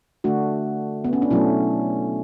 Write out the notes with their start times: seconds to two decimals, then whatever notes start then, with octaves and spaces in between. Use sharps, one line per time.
0.24 D3 A3 D4 F#4
1.04 B3
1.13 C#4
1.22 D4
1.30 B2 F#3 A3 C#4 E4